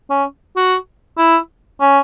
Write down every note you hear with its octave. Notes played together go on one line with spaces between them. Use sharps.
C#4
F#4
E4
C#4